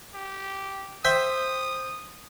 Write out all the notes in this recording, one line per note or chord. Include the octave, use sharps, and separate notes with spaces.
G4
C5 E5 G5 D#6